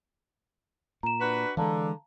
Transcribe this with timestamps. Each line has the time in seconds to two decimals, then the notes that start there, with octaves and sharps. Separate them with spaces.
1.03 A#2 A#5 E7
1.20 D4 F#4 B4
1.57 D3 E3 G3 G#3 F5 A5 A#5